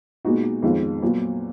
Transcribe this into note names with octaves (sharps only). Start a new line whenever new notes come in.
A#2 G#3 B3 D#4 F#4
F2 D#3 G#3 B3 F4
A#2 F#3 B3 F4